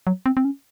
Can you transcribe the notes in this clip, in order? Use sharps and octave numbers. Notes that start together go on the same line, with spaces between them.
F#3
C4
C4
C#4